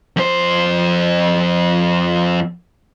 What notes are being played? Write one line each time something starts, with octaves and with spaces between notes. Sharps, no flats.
F2 C5